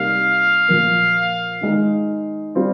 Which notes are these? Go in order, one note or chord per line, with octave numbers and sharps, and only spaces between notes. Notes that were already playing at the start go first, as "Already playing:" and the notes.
Already playing: C3 G3 A#3 D#4 F5
A#2 F3 A#3
D#3 G#3 D#4
G3 C4 F4